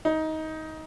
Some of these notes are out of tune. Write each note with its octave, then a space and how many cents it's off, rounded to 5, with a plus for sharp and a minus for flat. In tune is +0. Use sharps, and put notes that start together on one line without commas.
D#4 +20